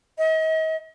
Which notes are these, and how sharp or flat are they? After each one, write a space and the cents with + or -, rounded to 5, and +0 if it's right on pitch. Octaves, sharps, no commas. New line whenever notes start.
D#5 +40